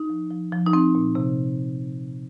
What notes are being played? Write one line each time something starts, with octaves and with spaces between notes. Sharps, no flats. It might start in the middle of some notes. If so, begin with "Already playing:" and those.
Already playing: D#4
F3
F3
F3
D#4
F3 C4
A#2
C3